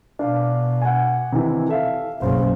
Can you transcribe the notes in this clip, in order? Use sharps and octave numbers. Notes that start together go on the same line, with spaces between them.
B2 D4 F5 D6
F#5 G#5
C3 D#3 E3
A4 E5 F5
F#1 B1 C#3 C5 F5